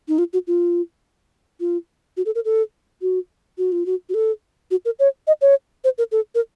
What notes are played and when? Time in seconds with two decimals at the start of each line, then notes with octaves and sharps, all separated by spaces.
0.08 D#4
0.18 F4
0.33 F#4
0.47 F4
1.60 F4
2.17 F#4
2.26 A4
2.35 A#4
2.45 A4
3.02 F#4
3.58 F#4
3.72 F4
3.86 F#4
4.09 F#4
4.14 A4
4.71 F#4
4.85 A#4
4.99 C#5
5.27 D#5
5.42 C#5
5.84 C5
5.98 A#4
6.12 A4
6.35 A#4